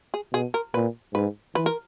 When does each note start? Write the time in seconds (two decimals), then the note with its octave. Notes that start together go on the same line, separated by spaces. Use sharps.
0.14 G#4
0.33 B2 G#4
0.54 A#4
0.74 A#2 B4
1.14 G#2 B4
1.55 E3 B4
1.66 A#4